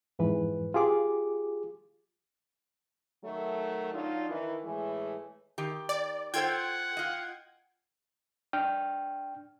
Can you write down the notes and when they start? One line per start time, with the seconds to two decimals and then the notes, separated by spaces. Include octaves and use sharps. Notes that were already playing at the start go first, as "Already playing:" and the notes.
0.19 F2 G#2 E3 B4
0.74 F4 G4 G#4 D6
3.24 D#3 F#3 A3
3.94 F#3 D4 D#4 F4
4.29 D#3 E3
4.65 A2 E3 G#3 A3
5.58 D#3 G4
5.89 D5
6.34 F4 A4 C5 F#5 G5 G#6
6.97 F4 D#5
8.53 D4 G5 F6